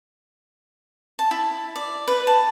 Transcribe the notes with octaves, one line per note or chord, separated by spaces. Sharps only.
A5
E4
D5
B4
A5